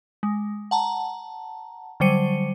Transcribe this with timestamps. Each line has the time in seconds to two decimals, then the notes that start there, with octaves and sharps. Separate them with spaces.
0.23 G#3
0.71 F#5 A5 A#5
2.00 D3 F#3 G3 C5 C#7 D#7